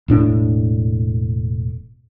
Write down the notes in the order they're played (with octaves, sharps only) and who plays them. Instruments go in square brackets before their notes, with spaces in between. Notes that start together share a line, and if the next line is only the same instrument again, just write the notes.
[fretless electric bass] E1 A2 D4